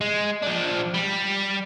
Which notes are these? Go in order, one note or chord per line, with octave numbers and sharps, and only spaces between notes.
G#3
F3 D4
G3